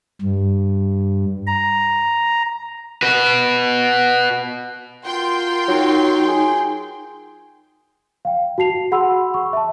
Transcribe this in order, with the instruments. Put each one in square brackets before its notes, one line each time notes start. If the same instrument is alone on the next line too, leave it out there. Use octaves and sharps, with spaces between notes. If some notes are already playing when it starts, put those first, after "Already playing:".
[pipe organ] G2
A#5
[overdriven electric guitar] F#4 B4
[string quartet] F4 F#4 A#4 [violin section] G5 C6
[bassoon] F#3 [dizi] D#4
[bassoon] G#4
[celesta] F5 G5
F#4 A5 C7 F7
G#4 F#5 B5 C6 E6
C#6
E5 A5